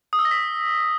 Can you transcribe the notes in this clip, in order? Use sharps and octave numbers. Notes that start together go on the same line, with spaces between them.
D#6
E6
A#6
B6